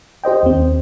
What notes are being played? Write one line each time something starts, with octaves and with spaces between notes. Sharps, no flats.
G4 C5 D#5 G5
D#2 C4